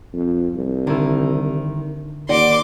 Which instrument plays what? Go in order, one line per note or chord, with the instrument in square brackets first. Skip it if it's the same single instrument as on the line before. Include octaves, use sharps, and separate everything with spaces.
[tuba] F2
C2
[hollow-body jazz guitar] D3 E4 [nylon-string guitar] D#3
[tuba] D#2 [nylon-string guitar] D5 D#5 F#5 [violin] C6 D6